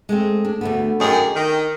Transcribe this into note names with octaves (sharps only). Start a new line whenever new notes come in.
G#3 A3 C4
D4
D2 A3 B3
F#2 D#3 G#4 D5 G5
D#3